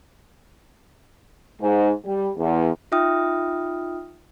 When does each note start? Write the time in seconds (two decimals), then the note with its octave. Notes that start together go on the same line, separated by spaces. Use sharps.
1.60 G#2
2.06 G3
2.36 E2
2.92 D#4 F4 E5 G5 D#6 F6